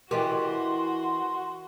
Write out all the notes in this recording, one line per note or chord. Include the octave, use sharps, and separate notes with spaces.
E3 F#4 G4 A#4 D#5 C6